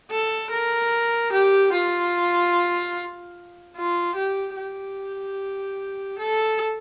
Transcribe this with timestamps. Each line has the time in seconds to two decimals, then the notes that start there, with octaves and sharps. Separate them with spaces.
0.11 A4
0.50 A#4
1.32 G4
1.72 F4
3.76 F4
4.16 G4
4.56 G4
6.18 A4